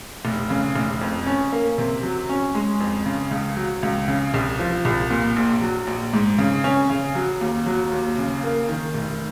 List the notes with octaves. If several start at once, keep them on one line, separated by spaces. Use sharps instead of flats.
F1
C#3
F1
F2
C#4
A#3
C3
F#3
C#4
G#3
F2
C#3
C#2
F#3
C#2
C#3
C2
F3
C2
A#2
A#1
F#3
A#1
G#2
C#3
C#4
C#3
F#3
D#2
F#3
D#2
C#3
A#3
D#3
F1